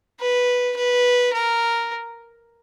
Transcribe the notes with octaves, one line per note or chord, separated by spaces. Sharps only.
B4
B4
A#4